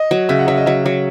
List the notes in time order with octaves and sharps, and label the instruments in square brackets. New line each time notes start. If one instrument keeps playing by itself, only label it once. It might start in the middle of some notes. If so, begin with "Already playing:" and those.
Already playing: [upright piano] D#5
[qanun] F#3
[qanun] C#3 [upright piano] E5
[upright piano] F#5
[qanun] F#3 [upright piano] E5
[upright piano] D#5
[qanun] F#3 [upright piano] E5
[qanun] F#3